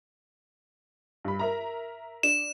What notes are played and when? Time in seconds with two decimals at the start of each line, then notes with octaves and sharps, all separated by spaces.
1.25 G2 B5
1.39 A#4 E5 A#5
2.23 D4 E7